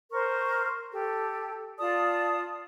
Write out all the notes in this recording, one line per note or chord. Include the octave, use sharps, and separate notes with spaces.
A#4 C5 C#6
G4 A4
F4 D5 A5 D#6